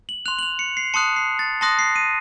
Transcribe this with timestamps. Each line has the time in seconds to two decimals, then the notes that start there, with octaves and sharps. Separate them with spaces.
0.09 F#7
0.26 C6 F#6 F7
0.39 F#7
0.43 F7
0.59 C#7
0.77 C7
0.94 A5 C6 D#6 F#6 C#7
1.16 C7
1.39 A6
1.61 A5 C6 D#6 F#6 A#6
1.79 C7
1.96 D#7